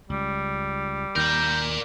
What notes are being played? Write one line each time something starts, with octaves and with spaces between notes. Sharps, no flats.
C#2 G3
D#2 D#3 A#4 D5 G5